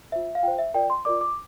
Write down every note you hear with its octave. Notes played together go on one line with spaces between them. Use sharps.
F4 C5 E5
F5
F4 C5 G5
E5
F4 A#4 D5 G5
C6
F4 A#4 D5 D6
D6